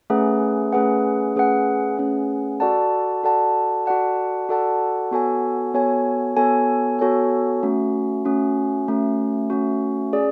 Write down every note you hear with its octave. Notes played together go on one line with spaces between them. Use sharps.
A3 C#4 G#4 B4 F#5
A3 C#4 G#4 B4 F#5
A3 C#4 G#4 B4 F#5
A3 C#4 G#4 B4 F#5
F#4 A4 D5 F#5 A5
F#4 A4 D5 F#5 A5
F#4 A4 D5 F#5 A5
F#4 A4 D5 F#5 A5
B3 F#4 A4 C#5 G#5
B3 F#4 A4 C#5 G#5
B3 F#4 A4 C#5 G#5
B3 F#4 A4 C#5 G#5
A3 C#4 F#4
A3 C#4 F#4
A3 C#4 F#4
A3 C#4 F#4
C#4 G#4 D5